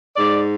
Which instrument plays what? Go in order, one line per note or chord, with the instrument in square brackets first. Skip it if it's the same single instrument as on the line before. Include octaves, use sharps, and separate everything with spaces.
[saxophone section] G#2 D5